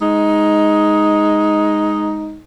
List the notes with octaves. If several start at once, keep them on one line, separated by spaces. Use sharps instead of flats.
G#3 D#4